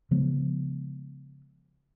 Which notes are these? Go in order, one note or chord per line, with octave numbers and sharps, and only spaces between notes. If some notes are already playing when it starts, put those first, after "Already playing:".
C#3 F3 G#3 B3